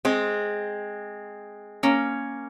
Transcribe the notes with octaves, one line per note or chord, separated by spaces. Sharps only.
G#3 C4
A#3 C#4